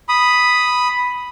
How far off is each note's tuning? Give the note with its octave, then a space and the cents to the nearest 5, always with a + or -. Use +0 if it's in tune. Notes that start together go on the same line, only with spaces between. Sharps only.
B5 +0 D#6 +0